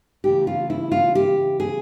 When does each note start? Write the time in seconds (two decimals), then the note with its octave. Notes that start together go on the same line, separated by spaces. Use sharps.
0.24 D2 C#3 E3 G4
0.47 F4
0.70 E4
0.92 F4
1.15 G4
1.60 G#4